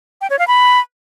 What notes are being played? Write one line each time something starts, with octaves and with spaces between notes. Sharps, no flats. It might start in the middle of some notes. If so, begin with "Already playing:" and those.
G5
C#5
F5
B5